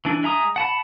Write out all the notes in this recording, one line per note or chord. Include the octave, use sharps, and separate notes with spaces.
E3 D4
G#3 E5 A#5 D#6
F#5 A5 B5